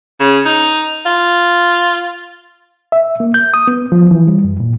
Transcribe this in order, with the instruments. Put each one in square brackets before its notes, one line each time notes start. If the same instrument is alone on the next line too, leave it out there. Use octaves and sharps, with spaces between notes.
[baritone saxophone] C#3
D#4
F4
[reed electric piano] E5
A#3
G6
D#6
B3
F3
E3
G3
F#2
A#2